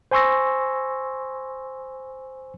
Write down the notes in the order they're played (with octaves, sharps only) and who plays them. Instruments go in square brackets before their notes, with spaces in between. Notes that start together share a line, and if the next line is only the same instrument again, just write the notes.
[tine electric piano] C5 G#5 C6 C#6 E6 A#6